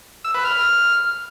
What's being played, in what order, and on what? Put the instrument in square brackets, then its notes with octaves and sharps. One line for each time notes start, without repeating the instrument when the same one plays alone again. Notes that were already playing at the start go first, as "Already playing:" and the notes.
[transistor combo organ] E6
B4
F6